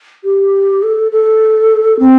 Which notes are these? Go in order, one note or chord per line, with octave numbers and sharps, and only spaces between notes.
G4
A4
A4
C4